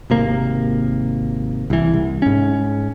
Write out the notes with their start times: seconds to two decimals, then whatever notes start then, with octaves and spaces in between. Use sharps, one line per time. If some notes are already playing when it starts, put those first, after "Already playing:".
0.10 G#1 C3 A#3
1.70 C2 E3
1.93 C2
2.22 G#2 C#4